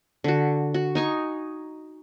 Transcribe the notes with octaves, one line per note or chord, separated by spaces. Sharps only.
D3 F#4
F#4
D#4 G#5 C#6